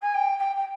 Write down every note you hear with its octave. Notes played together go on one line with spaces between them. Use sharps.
G#5
G5
G5
G5